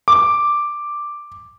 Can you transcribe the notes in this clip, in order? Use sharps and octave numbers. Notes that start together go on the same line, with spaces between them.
D6